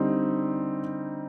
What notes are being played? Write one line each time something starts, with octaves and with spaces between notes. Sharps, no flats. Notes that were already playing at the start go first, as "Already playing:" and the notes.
Already playing: D3 G3 C4 D#4